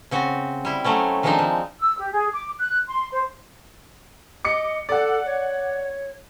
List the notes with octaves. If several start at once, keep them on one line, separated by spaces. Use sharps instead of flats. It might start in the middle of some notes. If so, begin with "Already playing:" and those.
C#3 C4 F#4
G3 E4
F#3 A3 C4 C#4
D#3 F3 G#3 C4 D4 D#4
F3
E6
G4
G#4
D6
F#6
C6
C5
D#5 D6 C#7
A4 D5 F#5
C#5